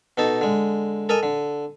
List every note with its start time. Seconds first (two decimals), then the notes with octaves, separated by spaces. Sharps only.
0.17 B2 D#4 A4
0.41 D3 G#3
1.09 A4 A#4 D#5 G#5
1.23 D3